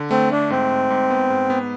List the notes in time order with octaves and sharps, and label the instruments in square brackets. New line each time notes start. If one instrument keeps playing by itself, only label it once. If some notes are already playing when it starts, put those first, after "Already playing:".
Already playing: [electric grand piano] D3
[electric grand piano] A3 [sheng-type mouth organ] C4
[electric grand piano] A3 [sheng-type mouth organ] D4
[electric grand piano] G#2 [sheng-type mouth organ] C4
[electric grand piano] G#2
G#2
B3
G#2
B3